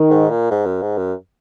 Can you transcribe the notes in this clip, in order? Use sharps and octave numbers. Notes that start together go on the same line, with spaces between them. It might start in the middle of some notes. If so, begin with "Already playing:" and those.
Already playing: D#3
G#2
A#2
G#2
F#2
G#2
F#2